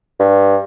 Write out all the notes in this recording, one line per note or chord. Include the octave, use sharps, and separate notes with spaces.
G2